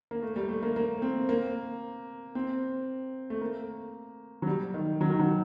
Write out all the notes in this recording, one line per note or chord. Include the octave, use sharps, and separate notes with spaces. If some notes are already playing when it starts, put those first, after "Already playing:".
A#3
A3
G3
A3
A#3
A#3
C4
A#3
C4
A3
A#3
F#3
G3
D#3
F#3
D#3
F#3